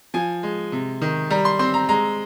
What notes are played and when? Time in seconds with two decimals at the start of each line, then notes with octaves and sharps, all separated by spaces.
0.14 F3 G#5
0.43 G#3
0.72 C3
1.02 D#3
1.30 G3 A#5
1.45 C6
1.59 C4 C6
1.74 A#5
1.89 G#3 A#5